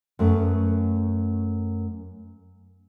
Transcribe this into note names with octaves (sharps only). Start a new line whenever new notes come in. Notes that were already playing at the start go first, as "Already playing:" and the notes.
F#2 A3 B3